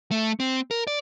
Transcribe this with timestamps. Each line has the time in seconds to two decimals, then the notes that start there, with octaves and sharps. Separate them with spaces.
0.11 A3
0.40 C4
0.71 A#4
0.87 D5